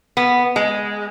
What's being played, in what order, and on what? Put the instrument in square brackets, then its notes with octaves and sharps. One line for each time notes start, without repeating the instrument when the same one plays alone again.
[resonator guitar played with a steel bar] B3
G#3